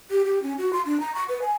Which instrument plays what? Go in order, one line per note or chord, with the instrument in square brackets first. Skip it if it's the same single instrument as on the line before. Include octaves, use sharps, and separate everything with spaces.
[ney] G4
G4
C#4
F#4
C6
D4
A#5
C#6
B4
G#5